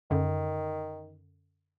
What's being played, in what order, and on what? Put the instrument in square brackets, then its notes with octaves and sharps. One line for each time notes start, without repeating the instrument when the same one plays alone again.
[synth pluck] F#2 D3 [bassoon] D#3